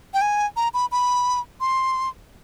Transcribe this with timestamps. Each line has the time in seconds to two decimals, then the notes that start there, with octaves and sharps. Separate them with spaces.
0.14 G5
0.21 G#5
0.56 A#5
0.74 B5
0.92 B5
1.61 C6